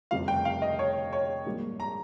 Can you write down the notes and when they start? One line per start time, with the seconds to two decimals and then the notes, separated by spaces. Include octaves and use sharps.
0.11 F1 F2 C#3 G3 F5
0.28 G5
0.45 F5
0.62 D#5
0.79 C#5
1.13 C#5
1.46 A#1 G#2 G3 A#3
1.80 A#5